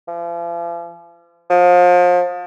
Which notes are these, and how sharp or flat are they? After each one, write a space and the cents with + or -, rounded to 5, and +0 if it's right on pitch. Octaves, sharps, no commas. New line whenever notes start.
F3 -40
F3 +30